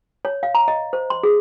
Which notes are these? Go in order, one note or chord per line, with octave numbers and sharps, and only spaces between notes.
C#5
F5
A#5
D#5
C5
C6
G#4